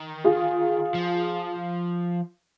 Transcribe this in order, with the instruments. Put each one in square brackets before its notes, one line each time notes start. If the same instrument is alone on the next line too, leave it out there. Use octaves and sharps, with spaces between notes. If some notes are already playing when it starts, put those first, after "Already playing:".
Already playing: [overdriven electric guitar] D#3
[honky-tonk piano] F4 G#4
[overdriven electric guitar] F3